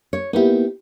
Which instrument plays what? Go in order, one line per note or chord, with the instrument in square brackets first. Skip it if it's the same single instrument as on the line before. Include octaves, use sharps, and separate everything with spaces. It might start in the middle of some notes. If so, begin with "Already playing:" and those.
[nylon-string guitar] C#5
[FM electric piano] A#3 B3 E4 [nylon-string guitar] D#4 G4